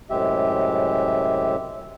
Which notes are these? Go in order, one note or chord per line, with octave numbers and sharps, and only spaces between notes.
F#2 A2 C3 G#3 G4 E5